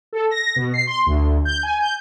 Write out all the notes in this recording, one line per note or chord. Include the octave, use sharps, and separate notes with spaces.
A4
A#6
B2
C7
C6
D2
G6
G#5
G6